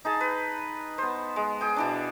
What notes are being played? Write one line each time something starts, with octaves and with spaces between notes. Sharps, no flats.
D#4 G#4 A5
B4
B3 C5
G#3
G#4 G5
B2 E3 D4